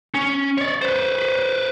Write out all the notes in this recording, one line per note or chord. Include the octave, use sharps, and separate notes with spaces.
C#4
C#5 D5
B4 C5